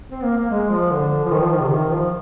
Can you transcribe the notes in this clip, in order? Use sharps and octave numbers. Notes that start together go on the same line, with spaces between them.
C4
A#3
A#3
G#3
F3
D3
F3
D#3
F3
D#3
C3
D#3
F3